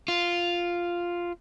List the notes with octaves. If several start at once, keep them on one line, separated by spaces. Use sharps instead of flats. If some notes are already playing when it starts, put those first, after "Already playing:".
F4